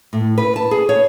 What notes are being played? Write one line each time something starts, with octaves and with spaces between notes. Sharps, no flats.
A2
B4
A5
G#4
C#5